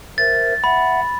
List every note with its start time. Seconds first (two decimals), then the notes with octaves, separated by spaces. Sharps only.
0.18 A#4 C5 E5 A6
0.64 E5 F#5 B5